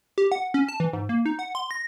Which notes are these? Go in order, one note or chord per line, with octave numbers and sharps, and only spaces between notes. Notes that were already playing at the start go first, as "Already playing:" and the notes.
G4
F#5
C#4
A5
E3
G#2
A#3
D#4
F#5
C6
A#6